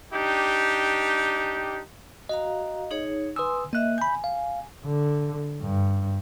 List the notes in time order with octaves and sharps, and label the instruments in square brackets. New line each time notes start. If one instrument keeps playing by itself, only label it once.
[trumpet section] D4 D#4 G4
[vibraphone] F#4 F5 A#5 [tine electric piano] D#5
[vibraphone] D#4 G#4 C#5
[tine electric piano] B4 D#6 E6 [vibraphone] G#5 C6
[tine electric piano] A#3 F#6 [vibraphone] D#5 E5
[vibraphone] G#5 [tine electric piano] B5 G6
[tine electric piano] F5
[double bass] D3
G2